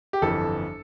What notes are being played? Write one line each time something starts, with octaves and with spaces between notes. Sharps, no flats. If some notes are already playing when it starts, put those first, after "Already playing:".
G4
G1 F2 E3 A4